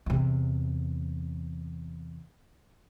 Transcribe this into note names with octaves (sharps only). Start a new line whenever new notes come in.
E2 C3